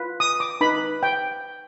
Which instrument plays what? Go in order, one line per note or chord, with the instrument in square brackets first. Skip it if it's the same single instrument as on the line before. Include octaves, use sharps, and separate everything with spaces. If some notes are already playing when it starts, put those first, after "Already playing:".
Already playing: [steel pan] F4 B4
D#6
D6
D#4 B4 B5
G5